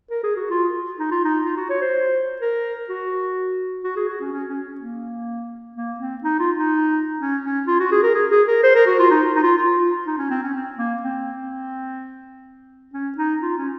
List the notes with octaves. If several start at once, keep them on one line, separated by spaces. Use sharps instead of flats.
A#4
G#4
F#4
F4
D#4
F4
D#4
F4
F#4
C#5
C5
A#4
F#4
F#4
G#4
F#4
C#4
C#4
C#4
A#3
A#3
C4
D#4
F4
D#4
C#4
C#4
F4
F#4
G#4
A#4
G#4
G#4
A#4
C5
A#4
F#4
F4
D#4
D#4
F4
F4
D#4
C#4
C4
C#4
C4
A#3
C4
C#4
D#4
F4
C#4